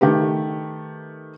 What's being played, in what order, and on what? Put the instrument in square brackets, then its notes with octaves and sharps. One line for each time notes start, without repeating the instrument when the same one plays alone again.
[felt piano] D#3 A3 G4 B4